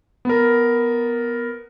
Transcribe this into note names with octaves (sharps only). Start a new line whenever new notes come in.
B3 A#4